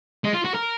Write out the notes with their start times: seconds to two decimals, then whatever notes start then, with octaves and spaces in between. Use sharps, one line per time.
0.24 G#3
0.34 F4
0.45 F#4
0.54 A#4